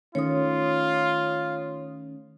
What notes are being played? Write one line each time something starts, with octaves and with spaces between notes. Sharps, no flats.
D#3 A3 C#4 F4 C#5 D#6